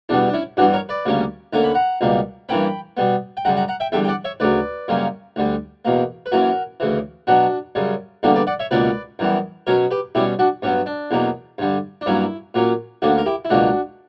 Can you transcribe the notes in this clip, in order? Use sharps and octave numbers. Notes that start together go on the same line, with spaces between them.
E2 B2 G3 B3 D4
D4
C#4 E4
G2 E3 G3 B3 D4 F#4
A#4 C#5
B4 D5
D2 C#3 G3 A#3 C#4
D2 D3 A#3 C#4 A#5
B5
F#5 A#5
C#2 B2 G3 A#3
G2 E3 A#3 C#4 G5 B5
B2 G3 B3
G5
F#2 C#3 G3 F#5 A#5
F#5 A#5
F#5 A#5
E5 G5
E2 D3 G3 E5 G5
G5
D5 F#5
C#5 E5
D2 C#3 F#3 B4 D5
F#2 C#3 G3 A#3 C#4
D2 D3 G3
E2 B2 A#3
B4
F#2 E3 A#3 C#4 F#4 A#4
D2 C#3 E3
B2 F#3 B3 D4 F#4
F#2 C#3 G3
E2 D3 G3 A#3 D4 F#4
B4 D5
D5 F#5
C#5 E5
C#2 B2 A#3 C#4 B4 D5
F#2 E3 G3 B3
B2 F#3 C#4 A#4 C#5
G4 B4
B2 G3 C#4 E4 G4
D4 F#4
G2 F#3 B3 C#4
D4
E2 B2 F#3 A#3
G2 D3 G3
D4
G2 F#3 A#3 C#4 E4
A#2 F#3 A#3 C#4
D2 D3 A#3 C#4 D4 F#4
A#4
E4 G4
E4
C#2 B2 F#3 A#3 D4 F#4